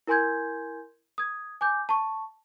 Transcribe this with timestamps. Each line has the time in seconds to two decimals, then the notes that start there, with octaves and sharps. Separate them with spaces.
0.07 E4 A#4 G#5 C6 G6 G#6
1.18 D#6 G#6
1.61 G#5 D6 G6
1.89 A5 C#6